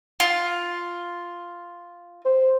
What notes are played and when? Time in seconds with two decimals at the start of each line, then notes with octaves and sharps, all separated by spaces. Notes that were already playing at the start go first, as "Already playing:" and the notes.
0.20 F4
2.25 C5